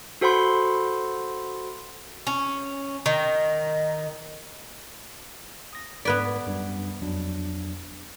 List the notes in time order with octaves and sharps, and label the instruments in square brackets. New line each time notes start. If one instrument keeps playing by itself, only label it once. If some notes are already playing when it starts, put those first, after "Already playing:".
[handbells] F#4 A4 C5 F#5 B5 C6
[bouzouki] C#4
D#3
[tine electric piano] D#6 A#6
[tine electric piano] G#2 G#6 B6 [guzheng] B3 B4 D5
[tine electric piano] F#2 G3 D4
F2 F#3 D4